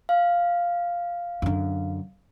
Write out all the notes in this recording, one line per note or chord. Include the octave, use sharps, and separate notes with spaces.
F5
F#2 D3